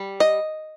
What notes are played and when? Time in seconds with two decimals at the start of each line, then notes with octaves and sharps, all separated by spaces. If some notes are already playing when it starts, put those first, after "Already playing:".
Already playing: G3
0.20 D#5